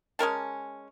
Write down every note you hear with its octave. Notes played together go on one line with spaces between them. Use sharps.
G#3 C#4 A#4 A5